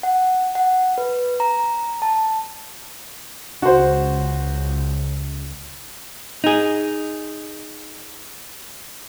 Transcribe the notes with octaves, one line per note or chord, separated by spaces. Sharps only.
F#5
F#5
B4
A#5
A5
C#2 F#4 C5
D#4 G#4